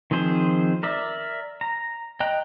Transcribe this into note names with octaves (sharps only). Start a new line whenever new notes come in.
D#3 F3 C4 G#4 C5
A#4 D5 E5
A#5
D#5 G5 A#5 F#6